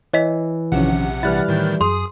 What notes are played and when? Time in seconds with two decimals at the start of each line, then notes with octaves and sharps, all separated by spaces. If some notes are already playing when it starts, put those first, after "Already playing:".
0.13 E3 C#5 D#5 B6
0.72 A#1 C3 D#3 F3 C#4 F#5
1.23 E3 G3 E4 F6 F#6 A6
1.48 A2 D#3 G6
1.81 F#2 G#4 C6 D#6